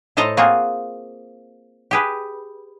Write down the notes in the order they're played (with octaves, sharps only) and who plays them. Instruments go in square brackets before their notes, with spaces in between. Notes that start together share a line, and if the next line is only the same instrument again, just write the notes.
[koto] A2 A4 C5 D#5 A5 A#5
A#3 C4 F4 F#4 G#4
G4 G#4 B4